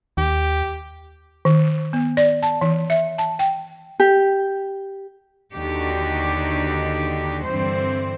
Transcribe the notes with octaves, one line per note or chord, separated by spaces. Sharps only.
D#2 G4
D#3
B3
D5
A5
E3
E5
A5
G5
G4
D#2 D3 D4 D#4 F#4 G4
G2 D3 E3 C4 C5